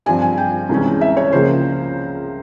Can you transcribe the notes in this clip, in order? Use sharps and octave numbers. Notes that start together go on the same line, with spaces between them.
G2 F3 C4 G#5
G#5
G5
C2 C3 E3 G#3 C#4
E5
C#5
C#2 C#3 F3 A#3 C5